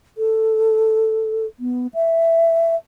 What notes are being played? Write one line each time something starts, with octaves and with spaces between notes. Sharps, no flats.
A4
B3
E5